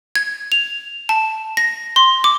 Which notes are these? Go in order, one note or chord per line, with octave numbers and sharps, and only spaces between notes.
G#6
F7
A5
A#6
C6
D6